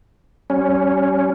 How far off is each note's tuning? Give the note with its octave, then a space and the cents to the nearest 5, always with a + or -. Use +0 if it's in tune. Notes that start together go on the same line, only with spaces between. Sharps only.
G3 -45 C#4 +0